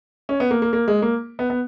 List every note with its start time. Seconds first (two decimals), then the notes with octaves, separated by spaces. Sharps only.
0.29 C#4
0.40 B3
0.51 A#3
0.62 A#3
0.73 A#3
0.88 G#3
1.02 A#3
1.39 B3
1.50 B3